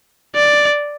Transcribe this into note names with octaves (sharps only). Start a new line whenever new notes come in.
D5